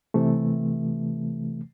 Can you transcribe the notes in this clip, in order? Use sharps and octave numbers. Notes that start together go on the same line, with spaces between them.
C3 E3 A3